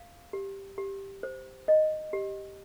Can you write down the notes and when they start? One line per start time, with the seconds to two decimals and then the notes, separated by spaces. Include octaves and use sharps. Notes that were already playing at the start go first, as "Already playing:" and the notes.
Already playing: F5
0.33 G4
0.78 G4
1.23 C5
1.68 D#5
2.13 G4